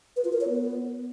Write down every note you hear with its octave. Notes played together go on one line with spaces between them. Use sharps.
B4
F4
A#4
C#5
B3